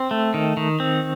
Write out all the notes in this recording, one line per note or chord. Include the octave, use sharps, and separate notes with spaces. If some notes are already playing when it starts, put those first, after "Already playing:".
Already playing: C4
A3
D#3
D#3
C4